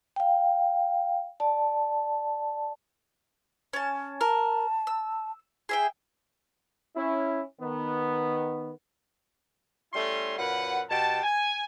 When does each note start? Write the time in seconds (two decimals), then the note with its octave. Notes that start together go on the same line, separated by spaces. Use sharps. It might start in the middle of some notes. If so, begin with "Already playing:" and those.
0.16 F5 G5
1.40 D5 A5
3.73 C#4 A5
4.21 A#4 A5
4.87 E6
5.69 G#4 E5 G5
6.96 C#4 E4
7.61 D#3 B3
9.93 G3 A3 C#4 E4 C6
10.38 F#2 A#2 B4 F#5
10.90 B2 G4 A5
11.23 G#5